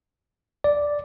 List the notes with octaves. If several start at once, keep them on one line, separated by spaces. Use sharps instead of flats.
D5